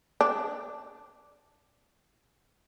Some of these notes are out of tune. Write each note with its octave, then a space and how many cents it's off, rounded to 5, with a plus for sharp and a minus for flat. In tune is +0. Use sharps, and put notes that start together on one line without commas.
D4 -10